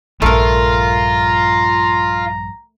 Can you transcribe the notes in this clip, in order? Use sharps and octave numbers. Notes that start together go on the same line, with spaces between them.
A#1 G2 A3 F4 A#4 A#5